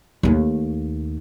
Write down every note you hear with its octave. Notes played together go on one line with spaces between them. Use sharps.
D#2 A3